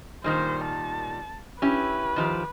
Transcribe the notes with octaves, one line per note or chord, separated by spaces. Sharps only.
A#2 D#3 G3 C5
A5
C#4 E4 G4 B4
D#3 F3 G4